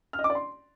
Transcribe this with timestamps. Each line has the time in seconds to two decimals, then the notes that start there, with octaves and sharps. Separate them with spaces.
0.13 F6
0.19 D#5
0.24 D6
0.30 D5
0.35 C6